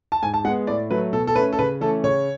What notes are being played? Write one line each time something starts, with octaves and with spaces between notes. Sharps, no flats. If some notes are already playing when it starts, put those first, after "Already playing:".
A5
G#2 G#5
A5
G#3 B3 F#5
A2 D5
F#3 A3 B4
B2 A4
A4
A3 C#4 B4
A4
C#3 B4
E3 A3 C#4 A4
C#3 C#5